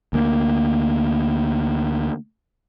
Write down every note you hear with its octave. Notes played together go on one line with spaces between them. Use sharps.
D2 A#3